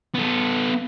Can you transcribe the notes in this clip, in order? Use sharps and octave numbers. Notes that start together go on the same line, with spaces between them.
B3 A4